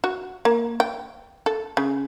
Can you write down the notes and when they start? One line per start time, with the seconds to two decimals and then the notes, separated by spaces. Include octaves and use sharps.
0.04 F#4
0.45 A#3
0.80 G5
1.46 A4
1.77 C#3